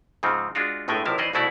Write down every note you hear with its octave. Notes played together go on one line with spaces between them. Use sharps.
G#2 C#3 F3 C4 D#4
G#3 D4 F4 F#4
G1 A2 G#3 A3 G5 G#5
B1 C3 F3 E4 A#4 A5
E3 C#4 D#4 C5 D5 D#5
C2 B2 A3 E4 F#4 D5